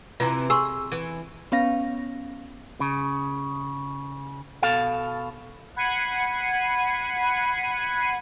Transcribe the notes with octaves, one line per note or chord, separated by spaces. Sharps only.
C3 E3 F4 A#5
G#4 C6 C#6 E6
E3
B3 C#4 F5 A#6
C#3
B2 A4 F5
F#5 B5 G#6 C7 C#7 D#7